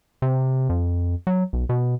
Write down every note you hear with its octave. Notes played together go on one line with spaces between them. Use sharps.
C3
F2
F#3
B1
B2